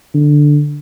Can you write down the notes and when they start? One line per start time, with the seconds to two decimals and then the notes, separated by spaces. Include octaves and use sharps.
0.14 D3